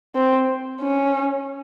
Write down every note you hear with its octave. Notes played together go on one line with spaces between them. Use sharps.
C4
C#4